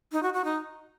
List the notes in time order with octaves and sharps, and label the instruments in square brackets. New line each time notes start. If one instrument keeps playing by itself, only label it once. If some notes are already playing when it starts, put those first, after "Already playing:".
[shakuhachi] D#4
F#4
F#4
D#4